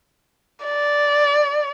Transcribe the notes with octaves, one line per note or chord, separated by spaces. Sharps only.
D5